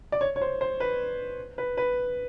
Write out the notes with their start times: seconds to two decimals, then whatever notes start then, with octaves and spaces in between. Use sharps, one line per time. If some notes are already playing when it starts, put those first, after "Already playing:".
0.12 D5
0.21 C#5
0.36 C#5
0.41 C5
0.61 C5
0.80 B4
1.58 B4
1.77 B4